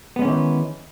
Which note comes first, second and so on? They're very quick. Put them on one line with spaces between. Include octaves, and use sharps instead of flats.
B3 G#3 C#4 E3 D#3